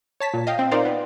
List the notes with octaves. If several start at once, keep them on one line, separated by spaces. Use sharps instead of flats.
C#5 A5 B6
A#2
D#5 F5 G5
C4
D#4 F4 A#4 C5 D5 F5
B3